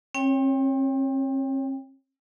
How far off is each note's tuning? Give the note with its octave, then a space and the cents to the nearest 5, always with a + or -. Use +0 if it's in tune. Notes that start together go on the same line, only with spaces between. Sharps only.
C4 +45 C#5 +0 G5 +20